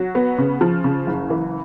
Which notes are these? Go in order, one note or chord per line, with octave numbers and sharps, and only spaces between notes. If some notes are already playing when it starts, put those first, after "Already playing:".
Already playing: F#3
B3
C#3
F3
C#3
F#1
E3